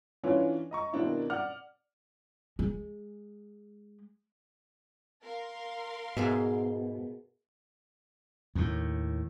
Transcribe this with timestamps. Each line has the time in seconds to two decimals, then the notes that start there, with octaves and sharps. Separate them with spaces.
0.24 E3 C#4 D4 F4 B4 C#5
0.71 D#5 A#5 C#6
0.93 B2 D#3 A#3 C4 D4 E4
1.30 D5 F#5 D6 F6
2.59 G#3
5.23 A#4 F5 C6
6.17 G#2 B2 A#3 G#4 E5
8.55 D#2 A2